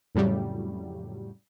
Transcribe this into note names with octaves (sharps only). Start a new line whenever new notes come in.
F2 A2 C#3 F#3 G3